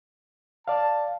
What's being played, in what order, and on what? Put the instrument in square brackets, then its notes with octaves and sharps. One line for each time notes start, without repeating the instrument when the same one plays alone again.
[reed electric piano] D5 F5 [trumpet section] A5